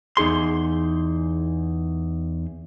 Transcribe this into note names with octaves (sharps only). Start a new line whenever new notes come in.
E2 D#4 G#4 C6